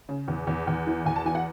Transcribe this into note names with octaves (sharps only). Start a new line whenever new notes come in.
C#3
E2
E2
E2
E3
E2 G#5
A5
E3 G#5
F#5